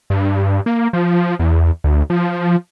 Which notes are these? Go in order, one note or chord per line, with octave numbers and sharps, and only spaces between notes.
G2
A#3
F3
E2
D2
F3